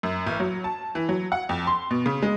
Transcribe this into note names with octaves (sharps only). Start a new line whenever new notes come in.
F#2
A1
F#3
A5
E3
F#3
F#5
F2
C6
B2
C#3
G#3